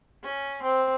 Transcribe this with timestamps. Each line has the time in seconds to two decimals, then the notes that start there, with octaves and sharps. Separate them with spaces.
0.23 C#4
0.62 C4